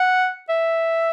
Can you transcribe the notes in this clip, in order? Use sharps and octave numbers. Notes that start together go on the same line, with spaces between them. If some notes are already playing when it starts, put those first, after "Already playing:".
Already playing: F#5
E5